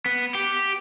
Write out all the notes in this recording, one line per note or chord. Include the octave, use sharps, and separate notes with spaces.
B3
G4